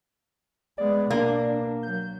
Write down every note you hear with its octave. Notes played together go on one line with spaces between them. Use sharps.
G#3 B3 D5
B2 A#3 D4
F#3 G6